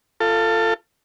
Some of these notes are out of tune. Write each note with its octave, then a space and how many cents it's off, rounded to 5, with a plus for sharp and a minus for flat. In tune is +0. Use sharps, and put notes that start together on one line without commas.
F4 -15 A4 +20